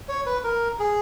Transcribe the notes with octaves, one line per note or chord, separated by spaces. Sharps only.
C#5
B4
A#4
G#4